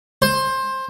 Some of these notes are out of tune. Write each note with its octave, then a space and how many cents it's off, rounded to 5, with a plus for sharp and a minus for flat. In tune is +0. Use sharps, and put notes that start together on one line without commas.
C5 +15